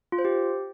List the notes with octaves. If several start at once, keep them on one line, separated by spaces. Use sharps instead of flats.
F4
C5
G4